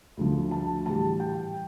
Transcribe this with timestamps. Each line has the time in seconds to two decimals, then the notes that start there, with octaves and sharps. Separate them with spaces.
0.17 D2 D3 F3
0.51 A5
0.86 A2 E3 G3 A5
1.20 G5